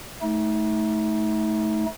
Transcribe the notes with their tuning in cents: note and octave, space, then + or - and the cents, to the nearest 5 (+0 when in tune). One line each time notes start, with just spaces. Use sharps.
A3 -15 D#4 +30